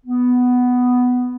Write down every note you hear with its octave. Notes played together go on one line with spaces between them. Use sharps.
B3